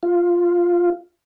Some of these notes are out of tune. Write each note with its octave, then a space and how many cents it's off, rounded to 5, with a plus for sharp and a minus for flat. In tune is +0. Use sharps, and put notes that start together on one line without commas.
F4 +0